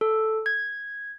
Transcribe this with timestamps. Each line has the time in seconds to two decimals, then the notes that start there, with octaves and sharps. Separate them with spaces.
0.01 A4
0.46 G#6